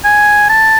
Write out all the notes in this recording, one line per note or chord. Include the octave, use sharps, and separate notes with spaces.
G#5
A5